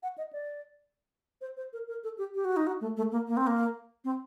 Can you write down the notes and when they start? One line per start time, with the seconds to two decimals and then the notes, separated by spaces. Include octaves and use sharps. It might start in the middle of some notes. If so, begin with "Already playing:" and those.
0.03 F#5
0.18 D#5
0.33 D5
1.41 C5
1.57 C5
1.73 A#4
1.88 A#4
2.04 A4
2.18 G4
2.35 G4
2.45 F#4
2.57 D#4
2.67 F#4
2.81 A3
2.97 A3
3.12 A#3
3.27 A#3
3.37 C4
3.47 A#3
4.04 C4